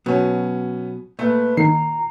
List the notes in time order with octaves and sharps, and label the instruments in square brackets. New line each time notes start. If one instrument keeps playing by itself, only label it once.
[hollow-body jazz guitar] B2 F#3 [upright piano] B3 C#4
[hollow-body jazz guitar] A#2 [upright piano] A3 [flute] B4
[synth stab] D#3 [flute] A#5 [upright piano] C7